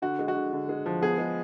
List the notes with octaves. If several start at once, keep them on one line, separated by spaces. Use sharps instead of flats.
D3 F#4
G#3
F#4
D3
D3
G#3
F3
B3 G#4
G#3